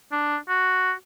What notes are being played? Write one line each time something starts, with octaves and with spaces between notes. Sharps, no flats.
D4
F#4